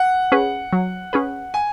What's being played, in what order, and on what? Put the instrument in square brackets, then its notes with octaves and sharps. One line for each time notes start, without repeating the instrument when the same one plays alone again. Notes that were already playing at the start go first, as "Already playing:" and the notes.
Already playing: [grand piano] F#5
[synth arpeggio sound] C#4 G#4 B4
F#3
C#4 G#4 B4
[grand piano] G#5